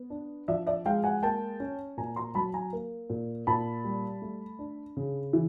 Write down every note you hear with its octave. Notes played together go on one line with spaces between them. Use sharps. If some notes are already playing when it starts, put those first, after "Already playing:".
Already playing: B3
D4
F3 D5 E5
D5 E5
G#3 F5 G5
F#5 G#5
A#3 G5 A5
C#4
A#2 G#5 A#5
A#5 C6
F#3 A5 B5
G#5 A#5
A#3
A#2
A#2 A5 B5
G3
A3
D4
C#3
E3